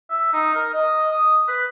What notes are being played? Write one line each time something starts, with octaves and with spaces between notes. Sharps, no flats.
E5
D#4
A#4
D#5
D#6
B4